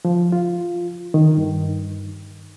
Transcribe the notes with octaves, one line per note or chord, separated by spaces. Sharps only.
F3
F4
D#3
G2